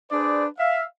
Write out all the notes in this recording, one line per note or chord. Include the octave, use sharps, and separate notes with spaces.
D4 G#4 B4 C5 D5
E5 F5